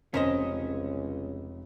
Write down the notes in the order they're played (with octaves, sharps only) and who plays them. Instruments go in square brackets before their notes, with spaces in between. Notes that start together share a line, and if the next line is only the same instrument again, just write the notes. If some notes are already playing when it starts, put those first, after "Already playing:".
[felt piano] F1 B6 [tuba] C#2 [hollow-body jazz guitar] C#4 [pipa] A#4 C5 D#5